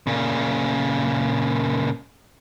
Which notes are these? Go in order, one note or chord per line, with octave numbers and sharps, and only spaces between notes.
A#2 C#3